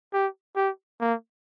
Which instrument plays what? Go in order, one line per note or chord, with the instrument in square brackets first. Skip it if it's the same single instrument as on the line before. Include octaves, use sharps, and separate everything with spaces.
[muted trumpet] G4
G4
A#3